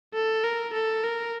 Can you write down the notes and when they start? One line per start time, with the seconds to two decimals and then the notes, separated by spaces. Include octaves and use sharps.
0.14 A4
0.44 A#4
0.73 A4
1.03 A#4